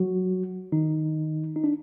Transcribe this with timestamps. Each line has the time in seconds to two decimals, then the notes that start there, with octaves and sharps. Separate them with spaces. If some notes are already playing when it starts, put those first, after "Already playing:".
Already playing: F#3 F#4
0.72 D#3 D#4
1.56 D#4
1.64 D4